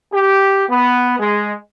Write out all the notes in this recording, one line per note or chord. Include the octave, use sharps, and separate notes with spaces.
G4
B3
G#3